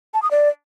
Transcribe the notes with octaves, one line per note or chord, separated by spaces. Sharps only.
A5
D#6
D5